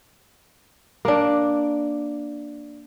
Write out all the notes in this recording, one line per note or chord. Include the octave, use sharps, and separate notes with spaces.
A#3 D4